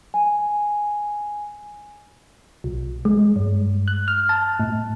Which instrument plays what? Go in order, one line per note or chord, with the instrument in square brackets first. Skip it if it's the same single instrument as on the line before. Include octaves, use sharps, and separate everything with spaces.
[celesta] G#5
[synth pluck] B1
G#3
G2
F#6
F6
A5
A2